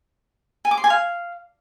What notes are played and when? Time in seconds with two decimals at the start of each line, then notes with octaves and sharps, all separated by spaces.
0.65 G#5
0.71 D6
0.77 C6
0.84 G#5
0.90 F5